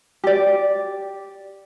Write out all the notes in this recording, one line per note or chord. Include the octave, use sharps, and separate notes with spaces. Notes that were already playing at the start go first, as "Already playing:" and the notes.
G4 D5